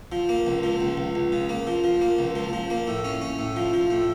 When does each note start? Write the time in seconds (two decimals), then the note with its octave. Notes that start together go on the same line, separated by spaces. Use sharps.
0.12 F3
0.29 A#3
0.47 C#2
0.63 F3
0.81 C#2
0.97 C#2
1.15 C#2
1.32 C#3
1.49 A#3
1.67 F3
1.84 F3
2.01 A#3
2.19 C#2
2.35 F3
2.53 F3
2.70 A#3
2.87 A2
3.05 C#4
3.22 C#4
3.39 A2
3.56 F3
3.73 F3
3.91 A2